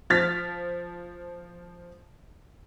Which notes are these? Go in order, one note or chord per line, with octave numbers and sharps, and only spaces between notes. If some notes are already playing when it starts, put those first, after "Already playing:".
F3 F6 A6 B6